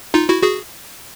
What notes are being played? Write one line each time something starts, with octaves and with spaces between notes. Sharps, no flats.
D#4 F4
E4 F#4
F#4 G#4